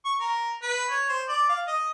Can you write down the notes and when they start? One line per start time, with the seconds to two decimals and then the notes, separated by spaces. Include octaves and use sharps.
0.05 C#6
0.20 A#4
0.62 B4
0.90 C#5
1.09 C5
1.29 D5
1.49 F5
1.67 D#5